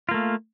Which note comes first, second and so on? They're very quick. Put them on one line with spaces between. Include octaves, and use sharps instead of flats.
F4 A#3 A3